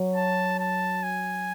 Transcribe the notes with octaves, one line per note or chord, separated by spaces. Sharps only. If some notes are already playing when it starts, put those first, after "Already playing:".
Already playing: F#3
A5
A5
G#5